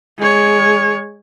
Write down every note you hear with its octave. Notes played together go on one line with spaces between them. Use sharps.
G#3 C#5